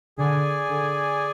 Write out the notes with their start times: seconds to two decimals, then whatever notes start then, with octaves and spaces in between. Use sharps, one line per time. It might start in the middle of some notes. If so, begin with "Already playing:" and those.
0.18 D3 G#4 D5 G#5
0.69 D3